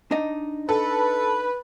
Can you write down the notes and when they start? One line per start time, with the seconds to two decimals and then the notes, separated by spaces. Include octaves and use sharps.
0.11 D4 D#4 D#5
0.69 A4 B4